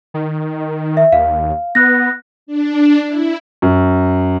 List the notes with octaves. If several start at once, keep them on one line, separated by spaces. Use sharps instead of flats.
D#3
E5
D#2 F5
B3 F#6 A#6
D4
E4
F#2